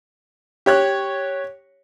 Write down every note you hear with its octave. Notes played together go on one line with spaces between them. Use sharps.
G4 C#5 F#6